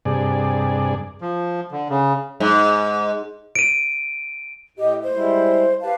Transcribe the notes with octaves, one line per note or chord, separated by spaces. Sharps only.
G2 C3 G#4 D5
F3
D3
C#3
G#2
D7 D#7
A2 G4 D#5
C5
G3 G#3 E4
G4 B4 F5 A5